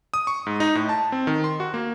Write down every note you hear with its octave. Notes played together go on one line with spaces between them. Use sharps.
D#6
C#6
G#2
D#4
A2
A5
C4
D#3
C6
F#4
A#3